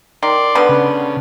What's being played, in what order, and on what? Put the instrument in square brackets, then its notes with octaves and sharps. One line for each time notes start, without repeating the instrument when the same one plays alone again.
[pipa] D#3 [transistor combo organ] D5 C6
[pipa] D3 G3 B3
[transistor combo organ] C#3